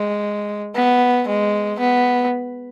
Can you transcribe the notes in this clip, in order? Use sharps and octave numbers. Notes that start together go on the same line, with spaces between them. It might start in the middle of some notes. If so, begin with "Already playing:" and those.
Already playing: G#3
B3
G#3
B3